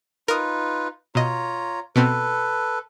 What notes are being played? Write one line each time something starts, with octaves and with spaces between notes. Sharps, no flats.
D#4 F4 A#4 B4 D#6
B2 F4 C#5 D#5 A#5
B2 B3 C4 A4 B4